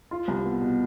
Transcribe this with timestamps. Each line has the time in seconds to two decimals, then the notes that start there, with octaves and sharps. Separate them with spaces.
0.11 F4
0.28 C2
0.44 B3
0.61 B2